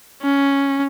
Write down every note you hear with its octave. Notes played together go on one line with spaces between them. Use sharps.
C#4